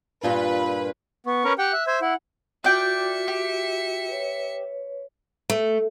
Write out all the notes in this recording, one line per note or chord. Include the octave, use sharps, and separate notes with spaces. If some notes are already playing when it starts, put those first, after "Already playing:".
G2 A#2 F4 B4
B3 C#6
C#4 A#4 B4
G4 F#5 G5 F#6
E5
C5 E5 G#6
E4 F#5
F4 F#4 D5 E5 G5 C#7
G4
B4 C#5
A3